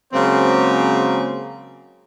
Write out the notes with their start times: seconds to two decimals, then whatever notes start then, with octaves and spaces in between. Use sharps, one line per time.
0.13 C#3 F#3 G#3 A#3 C4 C5